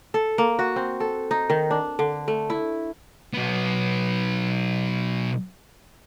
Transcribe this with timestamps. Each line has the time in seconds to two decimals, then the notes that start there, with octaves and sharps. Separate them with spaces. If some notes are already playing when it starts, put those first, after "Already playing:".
0.14 A4
0.38 A#3
0.59 F#4
0.76 C4
1.00 A4
1.31 D#4
1.50 D#3
1.71 D4
1.99 D3
2.28 A3
2.50 E4
3.34 B1 B3